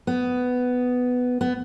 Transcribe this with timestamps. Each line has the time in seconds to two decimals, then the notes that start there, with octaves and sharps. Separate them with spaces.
0.07 B3
1.41 B3